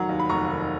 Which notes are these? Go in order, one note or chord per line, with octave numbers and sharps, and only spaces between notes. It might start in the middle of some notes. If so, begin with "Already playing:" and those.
Already playing: F1 D#3 F#3 F#5 A#5
D#2
B5
F1 A#5 C#6
D#3